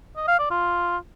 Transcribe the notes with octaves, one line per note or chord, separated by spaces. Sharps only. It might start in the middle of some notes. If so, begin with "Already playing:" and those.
D#5
F5
D5
F4